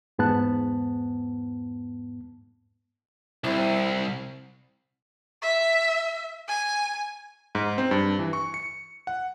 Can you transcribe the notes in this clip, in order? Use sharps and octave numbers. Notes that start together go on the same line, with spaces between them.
E2 G#2 B3 A5 F#6
C2 C4 E4
E5
G#5
G#2
C4
G2
E3
C#6
C#7
F#5